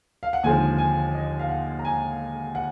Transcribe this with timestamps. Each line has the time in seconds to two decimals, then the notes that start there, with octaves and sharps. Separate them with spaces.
0.23 F5
0.33 F#5
0.43 D#2 D3 F3 G#3 G#5
0.78 G#5
1.15 D#5
1.39 F5
1.49 F#5
1.79 A#5
1.85 G#5
2.55 F#5